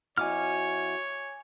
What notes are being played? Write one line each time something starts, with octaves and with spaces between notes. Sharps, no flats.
F2 E4 F#4 C#5 G#5 D6 F6